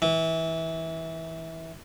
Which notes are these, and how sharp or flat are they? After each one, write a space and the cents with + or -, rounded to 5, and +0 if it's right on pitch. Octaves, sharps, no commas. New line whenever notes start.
E3 -20